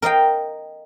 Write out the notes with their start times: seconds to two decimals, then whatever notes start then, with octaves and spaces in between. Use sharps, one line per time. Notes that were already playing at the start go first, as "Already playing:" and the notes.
0.02 A#4 D#5 F5 G5